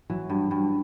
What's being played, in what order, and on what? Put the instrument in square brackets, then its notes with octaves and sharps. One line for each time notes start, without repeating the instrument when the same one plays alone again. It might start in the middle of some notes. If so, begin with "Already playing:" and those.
[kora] E3 [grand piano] F#3
[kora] G2
G2